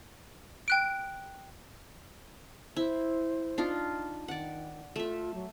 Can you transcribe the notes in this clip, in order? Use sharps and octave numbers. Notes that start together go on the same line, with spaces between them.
G5 F#6 D7
E4 C5
D4 D#4 F4
D#3 D5 F#5
A3 F4 E5
F#3